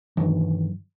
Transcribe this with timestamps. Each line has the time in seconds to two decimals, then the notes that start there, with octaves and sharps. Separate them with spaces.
0.17 G2 D#3 E3 F#3